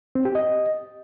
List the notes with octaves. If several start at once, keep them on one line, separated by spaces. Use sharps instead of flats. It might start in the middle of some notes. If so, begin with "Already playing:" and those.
C4
G4
D#5